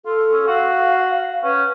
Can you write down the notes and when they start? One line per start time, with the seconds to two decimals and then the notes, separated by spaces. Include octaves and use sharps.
0.06 F4 A4
0.32 C#4
0.47 F#4 F5
1.43 C#4 B4